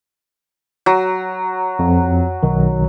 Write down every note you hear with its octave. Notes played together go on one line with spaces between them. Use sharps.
F#3
F2
B1 D#3